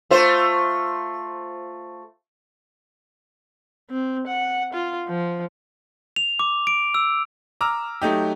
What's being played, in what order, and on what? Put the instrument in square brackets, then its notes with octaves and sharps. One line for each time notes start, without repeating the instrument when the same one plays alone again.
[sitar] A3 F4 C5
[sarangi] C4
F#5
F4
F3
[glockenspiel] F7
D6
D7
E6
[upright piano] A#5 D6 E6 F6
F#3 A3 D#4 G4